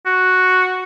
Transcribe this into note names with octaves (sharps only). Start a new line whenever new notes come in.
F#4